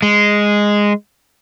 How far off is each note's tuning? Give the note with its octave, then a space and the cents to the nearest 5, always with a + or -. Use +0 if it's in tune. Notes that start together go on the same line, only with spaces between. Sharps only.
G#3 -5